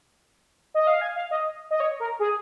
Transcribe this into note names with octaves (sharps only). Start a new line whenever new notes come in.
D#5
F5
G#5
F5
D#5
D#5
C#5
A#4
G#4